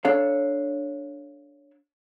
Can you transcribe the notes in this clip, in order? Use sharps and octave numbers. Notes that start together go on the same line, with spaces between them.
D4 A4 C#5 F5